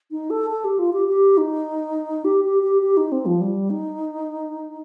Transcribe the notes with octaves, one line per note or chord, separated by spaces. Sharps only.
D#4
A4
A4
G4
F4
G4
G4
D#4
G4
G4
G4
G4
D#4
C4
F3
G3
D#4